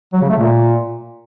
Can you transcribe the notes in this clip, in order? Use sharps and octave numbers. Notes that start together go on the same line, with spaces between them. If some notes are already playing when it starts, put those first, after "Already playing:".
F#3
C#3
A3
A#2